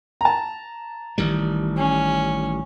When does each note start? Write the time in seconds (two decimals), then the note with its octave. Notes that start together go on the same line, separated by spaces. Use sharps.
0.21 A5 A#5
1.18 A1 D#3 G3
1.77 C#4